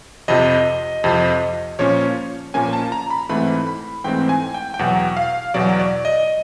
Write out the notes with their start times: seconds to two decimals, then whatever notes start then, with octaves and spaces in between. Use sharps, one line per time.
0.28 F2 C3 F3 D#5
1.04 F2 C3 F3
1.79 A#2 F3 A#3 C#4 C#5
2.54 A#2 F3 A#3 C#4 G#5
2.73 A5
2.92 A#5
3.10 B5
3.29 G#2 E3 A3 C4 B5
3.67 B5
4.04 G#2 E3 A3 C4 G5
4.29 G#5
4.54 G5
4.74 G5
4.79 E2 B2 F#3 F#5
5.17 F5
5.54 E2 B2 F#3 D5
5.79 D5
6.05 D#5